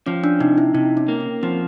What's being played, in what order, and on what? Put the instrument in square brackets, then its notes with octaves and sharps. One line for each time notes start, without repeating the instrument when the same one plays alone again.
[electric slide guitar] F3 [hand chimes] C#4
[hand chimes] D4
[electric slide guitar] C3 [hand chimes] D#4
[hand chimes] E4
[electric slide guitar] C3 [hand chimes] D#4
[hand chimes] C#4
[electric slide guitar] A#3
[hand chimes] C#4
[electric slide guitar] F3 [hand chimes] C4